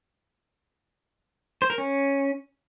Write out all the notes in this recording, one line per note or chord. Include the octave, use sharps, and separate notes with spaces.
C5
A#4
C#4